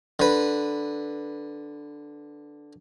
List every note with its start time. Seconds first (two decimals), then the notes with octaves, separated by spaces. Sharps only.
0.19 D3 B4